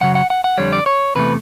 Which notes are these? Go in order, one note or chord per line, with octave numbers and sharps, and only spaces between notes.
F#2 C#3 F#3 F#5
F#5
F#5
F#5
F2 D3 G3 C#5
D5
C#5
E2 C3 E3 A3 B4